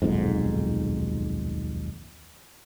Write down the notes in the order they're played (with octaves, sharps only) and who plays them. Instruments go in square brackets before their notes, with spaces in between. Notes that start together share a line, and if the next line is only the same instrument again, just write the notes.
[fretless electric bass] D#1 B1 F2 G#2